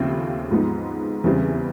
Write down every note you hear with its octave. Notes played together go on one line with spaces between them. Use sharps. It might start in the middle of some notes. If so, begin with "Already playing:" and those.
Already playing: D#2 C#3 F3 A3 C4
G#2 F3 G#3 B3 D#4
E2 C#3 E3 G3 C4